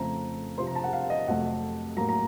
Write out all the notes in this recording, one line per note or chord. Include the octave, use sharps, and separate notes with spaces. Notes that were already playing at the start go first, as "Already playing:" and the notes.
Already playing: F2 C#3 F3 A3 C4 A#5
C3 F3 C4 C6
A#5
A5
F#5
F5
D#5
F2 C3 F#3 A3 F#5
A2 F#3 A#3 A#5
A#5